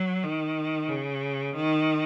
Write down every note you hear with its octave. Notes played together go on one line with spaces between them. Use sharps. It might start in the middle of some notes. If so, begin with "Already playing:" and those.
Already playing: F#3
D#3
C#3
D#3